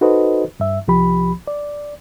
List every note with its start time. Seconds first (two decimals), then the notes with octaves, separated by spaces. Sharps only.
0.01 D#4 F#4 A4 B4 C5 D#5
0.60 G2 E5
0.88 C2 F3 G4 B5
1.47 D5